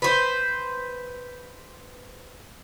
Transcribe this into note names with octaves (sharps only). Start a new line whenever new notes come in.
B4 C5